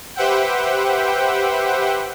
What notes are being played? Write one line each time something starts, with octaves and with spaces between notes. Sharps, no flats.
G4 B4 C5 E5 F#5 G5